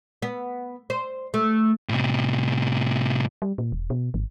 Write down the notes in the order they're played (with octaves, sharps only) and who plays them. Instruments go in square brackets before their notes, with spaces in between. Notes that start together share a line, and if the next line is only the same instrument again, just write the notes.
[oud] B3
C5
A3
[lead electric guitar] A2 C3
[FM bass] G3
A#2
E1
B2
G#1